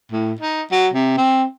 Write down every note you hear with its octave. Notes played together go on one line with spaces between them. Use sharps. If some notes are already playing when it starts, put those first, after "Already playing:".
A2
D#4
F#3
C3
C4